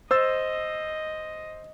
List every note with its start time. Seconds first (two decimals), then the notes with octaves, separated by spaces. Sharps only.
0.11 C5 D#5 E6 A6